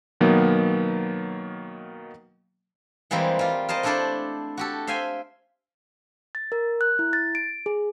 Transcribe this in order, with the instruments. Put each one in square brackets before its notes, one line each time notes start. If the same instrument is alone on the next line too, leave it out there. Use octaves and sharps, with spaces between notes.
[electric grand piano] B2 D#3 F#3 A#3 B3
[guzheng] E3 G3 G#3 A#3 C4
G3 F4
A#4 C5 D#5 A5
A3 D4 E4 A4 C5 D5
F#4 G4 A4
C5 E5 F5 G5 G#5
[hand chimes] A6
A#4
F#6
E4
A6
D7
G#4